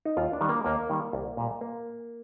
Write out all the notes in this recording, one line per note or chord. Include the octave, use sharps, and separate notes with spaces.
D#4
D#2 F4
D4
D#3 G3
A#3
D#2 A#3
D#3 G3
C2
A#2 G3
A#3